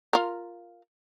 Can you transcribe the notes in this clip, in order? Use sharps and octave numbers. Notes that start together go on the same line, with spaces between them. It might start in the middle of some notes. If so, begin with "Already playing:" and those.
F4 A#4